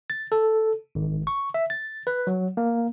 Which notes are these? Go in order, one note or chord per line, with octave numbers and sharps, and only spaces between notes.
A6
A4
G#1
C#6
E5
A6
B4
F#3
A#3